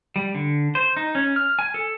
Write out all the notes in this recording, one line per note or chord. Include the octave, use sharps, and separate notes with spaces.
G3
D3
C5
D#4
C#4
F6
G#5
A4